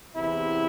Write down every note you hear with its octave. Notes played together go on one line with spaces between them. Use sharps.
E2 C3 E3 E4